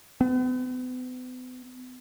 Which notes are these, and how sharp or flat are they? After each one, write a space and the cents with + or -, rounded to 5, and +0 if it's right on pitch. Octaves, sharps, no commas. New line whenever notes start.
B3 +40